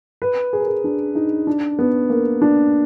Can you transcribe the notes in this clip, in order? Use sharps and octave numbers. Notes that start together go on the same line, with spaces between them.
B4
G#4
A#4
G#4
D4
D#4
D4
B3
A#3
D4